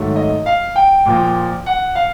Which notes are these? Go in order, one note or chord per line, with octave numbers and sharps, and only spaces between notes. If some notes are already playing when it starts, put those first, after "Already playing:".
Already playing: G#2 D#3 F#3 A3
D#5
F5
G5
A#2 F3 A#3
F#5
F5